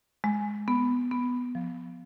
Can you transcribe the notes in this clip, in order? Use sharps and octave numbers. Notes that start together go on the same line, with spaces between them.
G#3
B3
B3
F3